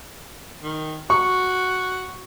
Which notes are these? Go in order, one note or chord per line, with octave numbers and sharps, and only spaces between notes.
D#3
F#4 C#6